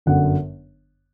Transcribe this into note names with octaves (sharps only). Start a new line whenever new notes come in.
G1 F#2 D3 F#5